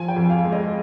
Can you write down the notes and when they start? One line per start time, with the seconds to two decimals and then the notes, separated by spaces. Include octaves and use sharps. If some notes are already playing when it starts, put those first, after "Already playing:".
Already playing: F3 G#5
0.08 G5
0.16 F2
0.30 F5
0.44 G#3
0.52 D#5